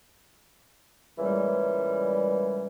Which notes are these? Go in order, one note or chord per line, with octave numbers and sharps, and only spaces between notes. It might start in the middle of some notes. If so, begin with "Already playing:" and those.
A#2 C#3 E3 G3 G#3